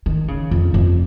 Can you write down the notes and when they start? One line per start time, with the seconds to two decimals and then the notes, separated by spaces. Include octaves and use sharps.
0.06 D#3
0.28 C#3
0.51 F2
0.74 F2